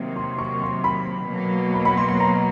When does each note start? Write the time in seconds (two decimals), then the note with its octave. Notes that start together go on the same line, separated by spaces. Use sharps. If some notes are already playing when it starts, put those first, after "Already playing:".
Already playing: C3 D#3 F#3 A#3
0.16 C6
0.38 C#6
0.62 C6
0.84 B5
1.29 B2 F#3 A#3
1.74 B5
1.85 B5
1.97 C6
2.09 C6
2.20 A#5